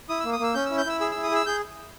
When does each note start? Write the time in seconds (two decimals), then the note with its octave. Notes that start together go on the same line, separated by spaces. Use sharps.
0.09 E4 D#6
0.20 A#3 E6
0.33 D#6
0.40 A#3 E6
0.54 C#4 G6
0.66 E4 E6
0.78 G6
0.86 E4 E6
1.01 G#4 E6
1.11 E4 E6
1.23 D#6
1.31 G#4 E6
1.46 G#4 G6